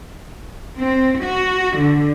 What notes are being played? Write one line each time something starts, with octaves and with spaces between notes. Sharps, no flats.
C4
F#4
D3